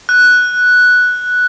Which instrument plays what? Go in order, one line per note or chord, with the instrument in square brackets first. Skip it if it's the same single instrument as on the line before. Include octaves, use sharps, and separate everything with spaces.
[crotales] F#6